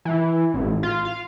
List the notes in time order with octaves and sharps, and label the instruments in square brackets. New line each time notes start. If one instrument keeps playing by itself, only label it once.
[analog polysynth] E3
A1
F4
F5